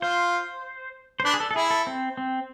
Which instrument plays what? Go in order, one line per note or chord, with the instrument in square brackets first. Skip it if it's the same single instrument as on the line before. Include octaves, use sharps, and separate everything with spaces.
[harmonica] F4 [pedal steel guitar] C5
[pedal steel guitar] C5
[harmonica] D4 [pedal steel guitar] B4
[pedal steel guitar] G#4
A4
A4
[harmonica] E4 [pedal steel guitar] G#4
[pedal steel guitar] A4
C4
C4